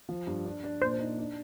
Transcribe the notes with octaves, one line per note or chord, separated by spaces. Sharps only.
F3
G2
D4
D4
A#2 C5
D#4
D4